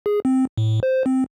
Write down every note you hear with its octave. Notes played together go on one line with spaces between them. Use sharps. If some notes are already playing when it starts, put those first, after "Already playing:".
G#4
C4
A2
C5
C4